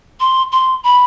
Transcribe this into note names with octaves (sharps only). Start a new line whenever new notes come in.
C6
C6
B5